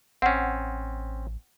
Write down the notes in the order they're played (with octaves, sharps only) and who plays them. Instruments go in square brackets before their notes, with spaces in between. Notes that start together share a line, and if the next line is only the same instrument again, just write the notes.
[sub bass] A1 [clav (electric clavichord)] C4 C#4 [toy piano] F#5